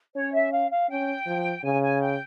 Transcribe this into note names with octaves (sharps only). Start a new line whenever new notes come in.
C#4 C#5
E5
F5
F5
C#4 G5
F3
C#3 G#5
G#5
G5